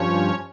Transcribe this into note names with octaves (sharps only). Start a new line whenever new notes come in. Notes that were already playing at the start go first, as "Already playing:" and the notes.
Already playing: G2 F3 C#4 C#5